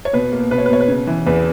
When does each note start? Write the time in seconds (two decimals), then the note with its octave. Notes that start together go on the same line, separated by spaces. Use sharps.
0.05 C#5
0.13 B2 B4
0.33 A#3
0.51 B2 B4
0.58 C#5
0.66 B4
0.70 B2 C#5
0.81 B4
0.88 C#3
1.07 E3
1.26 E2 B4